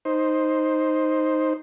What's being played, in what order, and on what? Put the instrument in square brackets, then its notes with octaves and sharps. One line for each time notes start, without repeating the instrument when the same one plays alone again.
[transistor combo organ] D#4 C5